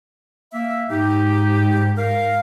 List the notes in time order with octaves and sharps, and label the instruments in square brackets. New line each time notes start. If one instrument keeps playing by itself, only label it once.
[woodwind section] A#3 E5
[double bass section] G#2 [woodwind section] D#4 G4
[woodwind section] A#4 F5